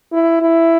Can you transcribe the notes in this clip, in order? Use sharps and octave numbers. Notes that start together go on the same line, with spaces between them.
E4
E4